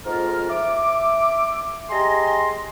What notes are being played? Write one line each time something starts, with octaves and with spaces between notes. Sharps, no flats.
F2 G#2 F4 A#4 F6
E5 D6
G4 G#4 D#5 G#5 A#5 C6